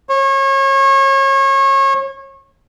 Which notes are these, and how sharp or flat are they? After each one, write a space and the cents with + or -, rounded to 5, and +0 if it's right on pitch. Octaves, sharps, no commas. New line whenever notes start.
C#5 -30